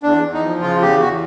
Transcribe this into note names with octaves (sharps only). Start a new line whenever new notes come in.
E2 D4
E2
D#4
F3
C#3 F4
E2 G4
E2 F#4